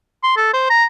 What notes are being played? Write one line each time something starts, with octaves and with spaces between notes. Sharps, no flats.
C6
A4
C5
A#5